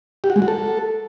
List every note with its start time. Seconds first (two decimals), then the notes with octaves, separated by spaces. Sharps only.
0.24 G4
0.30 F#4
0.36 G#3
0.42 F#4
0.48 A4